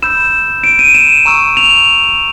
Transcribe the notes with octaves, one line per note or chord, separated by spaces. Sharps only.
B5 E6 G6 E7
D7
D#7
E7
A#5 C#6 E6
F7